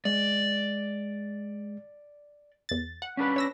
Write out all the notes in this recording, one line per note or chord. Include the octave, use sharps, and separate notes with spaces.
G#3 D5
E2 A6
F#5
C#4 D4 B4
C#5 E6 A#6